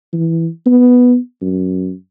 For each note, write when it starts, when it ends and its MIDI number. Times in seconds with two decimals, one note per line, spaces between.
0.13 0.49 52
0.66 1.17 59
1.42 1.93 42